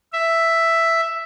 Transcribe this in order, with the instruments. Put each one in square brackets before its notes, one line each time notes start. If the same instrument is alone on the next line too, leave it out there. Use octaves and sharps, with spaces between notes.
[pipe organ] E5